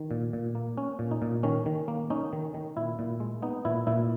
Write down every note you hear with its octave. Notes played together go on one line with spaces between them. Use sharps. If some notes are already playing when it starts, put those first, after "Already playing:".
Already playing: D#3
A#2
A#2
A#3
C#4
A#2
D#4
A#2
D#3 C#4
D#3
A#3
C#4 D#4
D#3
D#3
A#2 E4
A#2
G#3
B3 D#4
A#2 E4
A#2 E4